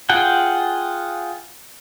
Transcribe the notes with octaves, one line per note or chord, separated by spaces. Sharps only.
F4 G#4 F#5 G5